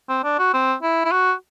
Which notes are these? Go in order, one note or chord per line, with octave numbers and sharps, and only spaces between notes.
C4
D4
F#4
C4
E4
E4
F#4